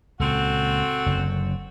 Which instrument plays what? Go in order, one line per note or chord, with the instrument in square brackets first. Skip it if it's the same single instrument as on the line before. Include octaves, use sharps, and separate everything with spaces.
[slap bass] C#2 A#2 [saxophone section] C4 F#4 A4
[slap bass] F#1 F#2 D3